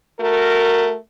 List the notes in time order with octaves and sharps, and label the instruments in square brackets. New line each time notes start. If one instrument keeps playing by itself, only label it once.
[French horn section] A3 F#4 A#4